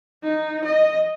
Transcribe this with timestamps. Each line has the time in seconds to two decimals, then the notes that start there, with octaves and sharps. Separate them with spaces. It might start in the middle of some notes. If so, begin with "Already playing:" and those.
0.23 D#4
0.65 D#5